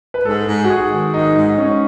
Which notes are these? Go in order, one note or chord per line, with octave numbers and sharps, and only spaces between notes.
B4
G#2 A4
G#2
F#4
G#2 G#4
D#3
G#2 D#4
G#2 D#4
G#2 C#4